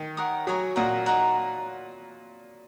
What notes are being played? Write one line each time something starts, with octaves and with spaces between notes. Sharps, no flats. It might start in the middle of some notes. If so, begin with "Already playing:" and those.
Already playing: D#3
A#4 C#5 F#5 D#6
F#3 A#4 C#5 G#5 D#6
A#2 A#4 F#5 A#5 D#6
D#4 A#4 F#5 A#5